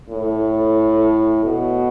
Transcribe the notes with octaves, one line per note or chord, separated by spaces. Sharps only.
A2
B2